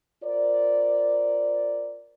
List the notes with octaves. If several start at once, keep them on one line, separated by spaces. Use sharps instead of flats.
F4 A#4 C5 D5